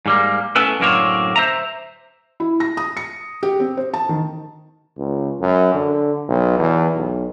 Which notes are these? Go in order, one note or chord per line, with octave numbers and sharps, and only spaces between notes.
G#2 G3 A#3
A3 B3 C#4 E4 A4 B4
F#2 A2 D3 A#3 C4 C#5
C5 E5 A#5
E4
A#6
D#6
C#7
G4
C4
C5
A5
D#3
C#2
F#2
D3
B1
E2
B1